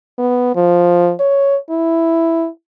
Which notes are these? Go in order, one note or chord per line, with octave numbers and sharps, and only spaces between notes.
B3
F3
C#5
E4